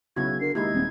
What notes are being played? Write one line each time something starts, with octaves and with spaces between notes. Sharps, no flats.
B1 C#3 E4 F#4 G#6
D3 A#4 C7
D#2 G#3 D#4 E4 G4 G#6
D#1 C4